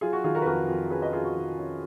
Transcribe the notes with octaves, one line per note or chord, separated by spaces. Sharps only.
F#3 F4 G#4
F#4
D#3 F4 G#4
F#4 A#4
B4
F2 F#4 A#4
F2
C#4 G#4 B4
B4 D#5
F2 F4 G#4
F#4
D#3
C#4